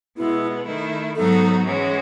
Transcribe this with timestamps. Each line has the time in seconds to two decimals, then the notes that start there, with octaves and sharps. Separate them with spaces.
0.17 B2 G#3 B3 E4
0.67 D#3 A3 E4
1.16 G#2 F#3 B3 D#4 F#4 A4
1.66 E3 G#3 C#4 F#4